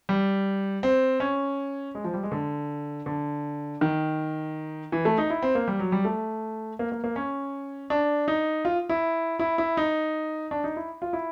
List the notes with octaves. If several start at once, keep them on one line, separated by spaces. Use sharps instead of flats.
G3
C4
C#4
G#3
F3
G3
G#3
D3
D3
D#3
E3
A3
D#4
E4
C4
A#3
G3
F#3
G3
A3
A#3
A#3
A#3
C#4
D4
D#4
F4
E4
E4
E4
D#4
D4
D#4
E4
F4
E4